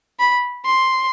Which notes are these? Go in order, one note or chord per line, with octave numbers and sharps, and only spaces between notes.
B5
C6